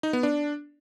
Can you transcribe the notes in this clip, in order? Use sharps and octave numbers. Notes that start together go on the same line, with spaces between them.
D#4
B3
D4